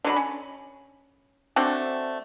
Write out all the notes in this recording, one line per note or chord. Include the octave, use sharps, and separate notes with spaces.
D3 F#3 B5
C#4
A3 C4 D4 F#4